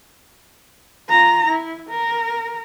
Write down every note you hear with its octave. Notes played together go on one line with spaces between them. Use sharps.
F4 A#5
E4
A#4